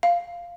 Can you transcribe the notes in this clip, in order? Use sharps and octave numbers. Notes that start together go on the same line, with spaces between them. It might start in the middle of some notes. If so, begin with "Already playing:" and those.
F5